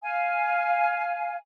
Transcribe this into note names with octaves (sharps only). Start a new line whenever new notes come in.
F5 G#5